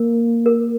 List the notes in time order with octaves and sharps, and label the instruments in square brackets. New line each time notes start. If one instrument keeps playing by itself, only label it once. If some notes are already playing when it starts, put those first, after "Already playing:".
Already playing: [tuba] A#3 [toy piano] A#4
[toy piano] A#4